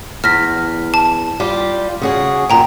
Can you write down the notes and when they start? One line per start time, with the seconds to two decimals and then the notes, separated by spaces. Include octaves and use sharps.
0.24 E2 F6 A#6 B6
0.94 A5
1.40 G3 F4 G4
2.02 C#3 F#4 G#4
2.50 F#2 A#2 D3 G5 A#5